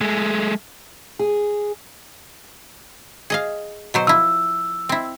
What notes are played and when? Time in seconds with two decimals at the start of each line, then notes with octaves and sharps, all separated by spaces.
0.01 G#3 A3
1.19 G#4
3.30 G#4 D#5 F5
3.94 B2 F#3 C5
4.07 F3 E4 E6
4.89 C4 E4